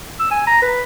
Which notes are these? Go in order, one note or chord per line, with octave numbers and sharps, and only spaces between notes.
E6
G#5
A#5
B4